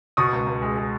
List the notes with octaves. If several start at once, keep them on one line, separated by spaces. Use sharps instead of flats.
B2 C#6 D#6
C#2
C#2
G#3
G#3